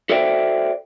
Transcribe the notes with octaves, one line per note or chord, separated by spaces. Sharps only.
F#4 A4 C5 D5 E5 G5